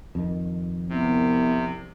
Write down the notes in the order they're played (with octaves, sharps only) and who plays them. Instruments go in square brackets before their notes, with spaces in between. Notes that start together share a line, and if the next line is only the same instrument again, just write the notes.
[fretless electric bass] F2 D#3
[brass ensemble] C2 [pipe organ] C3 [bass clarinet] B3